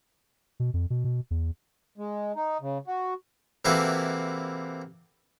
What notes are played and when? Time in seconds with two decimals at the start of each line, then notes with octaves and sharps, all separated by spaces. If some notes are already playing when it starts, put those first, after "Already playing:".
0.60 B2
0.74 F2
0.90 B2
1.05 B2
1.31 E2
1.97 G#3
2.36 D#4
2.61 C#3
2.87 F#4
3.65 C3 E3 A#3 E4 F#4 A4